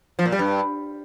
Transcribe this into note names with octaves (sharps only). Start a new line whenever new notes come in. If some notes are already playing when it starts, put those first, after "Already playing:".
F3
A#2
G3
G2